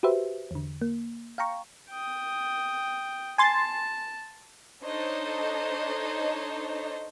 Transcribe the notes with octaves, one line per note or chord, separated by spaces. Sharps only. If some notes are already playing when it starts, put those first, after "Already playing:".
F#4 G4 B4 C5 E5
E2 D3
A#3
F5 G5 A#5 C#6
G5 D#6
G#5 A5 C6 A6
D4 D#4 A4 C5 C#5 D#5